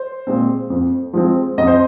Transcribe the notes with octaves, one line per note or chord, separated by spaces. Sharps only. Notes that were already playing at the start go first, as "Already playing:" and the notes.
Already playing: C5
A#2 G#3 C4
F2
F3 G#3 C4
F2 D#5
C5